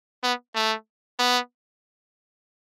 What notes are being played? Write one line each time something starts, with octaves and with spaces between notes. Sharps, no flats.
B3
A3
B3